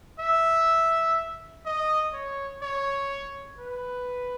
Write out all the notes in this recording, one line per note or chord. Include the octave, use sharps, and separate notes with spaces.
E5
D#5
C#5
C#5
B4